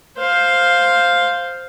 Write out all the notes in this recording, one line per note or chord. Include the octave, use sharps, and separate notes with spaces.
C5 F5